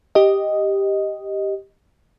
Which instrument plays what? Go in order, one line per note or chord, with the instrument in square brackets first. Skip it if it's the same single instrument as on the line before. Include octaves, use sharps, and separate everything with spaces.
[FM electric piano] G4 D#5